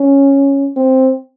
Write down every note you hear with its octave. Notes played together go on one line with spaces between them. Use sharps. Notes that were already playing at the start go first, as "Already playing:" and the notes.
Already playing: C#4
C4